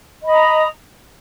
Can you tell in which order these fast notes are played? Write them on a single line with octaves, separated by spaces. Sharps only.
D#5 B5 D#6 A#5